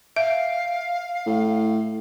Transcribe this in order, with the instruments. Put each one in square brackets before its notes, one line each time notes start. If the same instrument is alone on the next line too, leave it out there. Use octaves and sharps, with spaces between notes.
[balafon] E5 [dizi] F5
[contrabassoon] A2